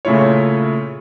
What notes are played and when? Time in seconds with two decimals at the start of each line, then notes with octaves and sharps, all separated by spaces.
0.05 A#2 C#3 A3 E4 F4 C#5